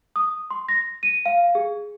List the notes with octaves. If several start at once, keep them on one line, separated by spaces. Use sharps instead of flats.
D#6
C6
A#6
D#7
F5
G#4